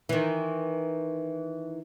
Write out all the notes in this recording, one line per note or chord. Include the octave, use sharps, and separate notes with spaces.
D#3 E3